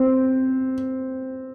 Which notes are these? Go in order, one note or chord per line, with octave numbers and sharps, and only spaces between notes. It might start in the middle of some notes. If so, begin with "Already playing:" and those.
Already playing: C4